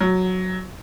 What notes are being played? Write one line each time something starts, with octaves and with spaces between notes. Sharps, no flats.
F#3